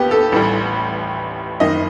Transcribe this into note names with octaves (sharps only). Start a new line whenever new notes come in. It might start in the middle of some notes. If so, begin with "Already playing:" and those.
Already playing: D#2 B3 G4
A4
A1 A2 E3 G3
F#1 F#2 D#3 D#5